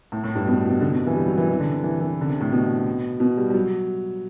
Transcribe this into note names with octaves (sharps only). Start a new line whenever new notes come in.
A2
A2
G2
B2
B2
C3
D3
B2
C3
E3
G3
F#3
E3
E3
D3
C3
E3
E3
D3
C3
A2
B2
B2
G3
G3
F#3